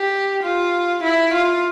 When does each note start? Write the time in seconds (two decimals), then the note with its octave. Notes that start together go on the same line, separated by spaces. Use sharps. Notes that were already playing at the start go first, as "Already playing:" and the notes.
Already playing: G4
0.43 F4
1.03 E4
1.34 F4